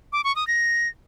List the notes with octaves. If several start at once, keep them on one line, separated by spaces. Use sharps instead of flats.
D6
C#6
D#6
A#6